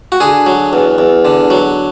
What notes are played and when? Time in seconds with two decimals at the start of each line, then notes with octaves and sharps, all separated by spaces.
0.12 F#4
0.20 D3 G#4
0.46 F#3
0.73 E2
0.98 E2
1.25 D3
1.50 F#3